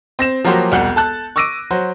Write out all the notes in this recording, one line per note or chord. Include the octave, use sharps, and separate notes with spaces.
C4 A#6 E7
F3 F#3 A#3 F#4 G4 C5
E1 C2 F#5 F#6 G6
A4 A5 F#6 A6
C#6 D6 E6 A#6 D7 D#7
F#3 F#4 C5